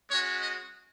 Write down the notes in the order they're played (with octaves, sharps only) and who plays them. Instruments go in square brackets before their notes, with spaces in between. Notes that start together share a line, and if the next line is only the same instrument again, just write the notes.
[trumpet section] G#3 C#4 F#4 C#5
D#5